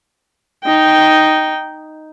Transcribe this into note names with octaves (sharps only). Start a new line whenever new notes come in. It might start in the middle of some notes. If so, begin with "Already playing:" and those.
D#4 G5